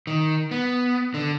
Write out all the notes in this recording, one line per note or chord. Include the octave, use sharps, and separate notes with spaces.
D#3
B3
D3